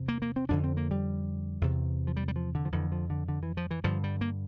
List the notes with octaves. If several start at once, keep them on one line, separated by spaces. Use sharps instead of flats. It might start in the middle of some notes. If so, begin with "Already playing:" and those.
Already playing: E2 C3
A#3
A#3
C4
F2 D3 D4
C4
A#3
G3
E2 C3
F3
G3
G3
F3
D3
F3
F2 D3 E3
F3
D3
D3
E3
F3
E3
G2 D3 F3
G3
A#3